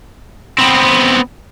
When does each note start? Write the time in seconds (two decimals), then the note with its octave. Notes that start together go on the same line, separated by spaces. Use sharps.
0.59 B3 C4